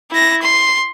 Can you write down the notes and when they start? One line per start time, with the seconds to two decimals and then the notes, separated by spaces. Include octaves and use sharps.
0.11 E4 A#6
0.42 C6